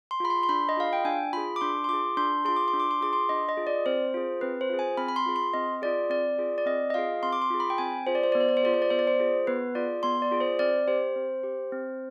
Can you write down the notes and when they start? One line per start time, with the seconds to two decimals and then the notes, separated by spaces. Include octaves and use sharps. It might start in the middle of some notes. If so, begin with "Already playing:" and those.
0.11 C6
0.20 F4 G#4 B5
0.30 C6
0.43 C6
0.49 D4 B5
0.69 D#5
0.77 F4 G#4 F5
0.93 G5
1.05 D4 G#5
1.33 F4 G#4 B5
1.56 D6
1.61 D4 C6
1.84 C6
1.89 F4 G#4 D6
2.17 D4 C6
2.45 F4 G#4 C6
2.56 D6
2.68 C6
2.73 D4
2.80 D6
2.91 C6
3.01 F4 G#4 D6
3.13 C6
3.29 D4 D#5
3.49 D#5
3.57 F4 G#4
3.67 D5
3.86 C4 C5
4.14 F4 G#4
4.41 C4 B4
4.61 C5
4.70 F4 G#4
4.79 G#5
4.97 C4 B5
5.09 B5
5.16 C6
5.26 F4 G#4
5.36 C6
5.54 C4 D#5
5.82 F4 G#4 D5
6.10 C4 D5
6.38 F4 G#4
6.58 D5
6.66 C4 D#5
6.90 D#5
6.94 F4 G#4 F5
7.23 C4 C6
7.33 D6
7.42 C6
7.50 F4 G#4
7.60 B5
7.70 G5
7.78 C4 G#5
8.07 F4 G#4 C5
8.15 D5
8.23 C5
8.32 B3 D5
8.41 C5
8.49 D5
8.57 C5
8.63 F4 G#4 D5
8.74 C5
8.82 D5
8.90 B3 C5
8.99 D5
9.07 C5
9.20 F4 G#4
9.47 B3 B4
9.75 F4 G#4 D5
10.03 B3 C6
10.22 D5
10.31 F4 G#4
10.41 C5
10.59 C4 D5
10.88 G4 C5
11.16 C4
11.43 G4
11.72 C4